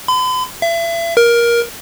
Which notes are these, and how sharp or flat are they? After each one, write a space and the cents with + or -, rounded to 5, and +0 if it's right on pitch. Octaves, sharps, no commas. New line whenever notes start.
B5 +45
E5 +35
A#4 +15